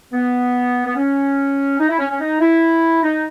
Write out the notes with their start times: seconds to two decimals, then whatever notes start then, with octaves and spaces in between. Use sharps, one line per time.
0.13 B3
0.86 B3
0.96 C#4
1.79 D#4
1.89 E4
1.99 C#4
2.09 C#4
2.20 D#4
2.40 E4
3.03 D#4